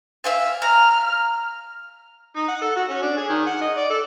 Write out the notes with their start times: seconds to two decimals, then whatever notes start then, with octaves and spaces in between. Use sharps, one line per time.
0.24 E5 F5 G#5
0.62 A#5 F6
2.36 D#4
2.48 F#5
2.61 A4
2.76 F#4
2.89 C#4
3.02 D4
3.17 G#4
3.29 D#3
3.47 F#5
3.61 D#5
3.76 D5
3.90 A4